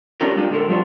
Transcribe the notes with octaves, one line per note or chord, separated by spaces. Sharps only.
B3 C#4 D4 F4 G4 A#4
G#3 A#3 D4 F4 G4
A#2 D3 G#3 C#4 A4 A#4
F3 G3 B3 D4 F4 F#4